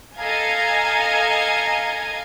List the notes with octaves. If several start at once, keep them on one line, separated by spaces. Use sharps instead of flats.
A4 D#5 F5 G#5 A#5 G#6